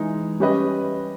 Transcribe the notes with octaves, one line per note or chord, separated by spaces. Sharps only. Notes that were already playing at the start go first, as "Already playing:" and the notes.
Already playing: E3 G#3 D#4
G3 C#4 G4 B4 D#5